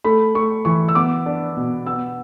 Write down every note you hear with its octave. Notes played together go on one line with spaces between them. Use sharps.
A3 B5
A3 C#6
E3 C#6
E6
B3 D6
D4
B2
B3 E6